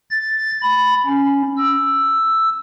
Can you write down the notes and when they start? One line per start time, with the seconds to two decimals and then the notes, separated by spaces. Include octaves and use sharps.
0.11 A6
0.63 B5
1.06 C#4
1.58 E6